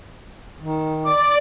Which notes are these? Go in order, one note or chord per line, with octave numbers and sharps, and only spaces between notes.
D#3
D5 D6